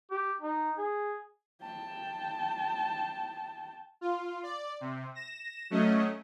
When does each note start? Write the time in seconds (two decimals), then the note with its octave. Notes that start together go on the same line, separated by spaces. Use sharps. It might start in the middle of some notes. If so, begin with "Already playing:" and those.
0.11 G4
0.41 D#4
0.78 G#4
1.62 G5 A5
4.01 F4
4.43 D5
4.81 C3
5.15 A#6 E7
5.70 F#3 A3 C#4 D#5